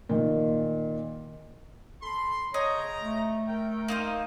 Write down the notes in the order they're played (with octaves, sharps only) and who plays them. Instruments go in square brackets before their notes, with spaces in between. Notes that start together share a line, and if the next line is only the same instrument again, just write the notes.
[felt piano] A#2 D#3
[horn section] A4 B5 C6
[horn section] C#3 G5 A#5 [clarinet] C#5 [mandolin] D#5
[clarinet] A3
[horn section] A#4 G5
[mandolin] A#3 D#4 C5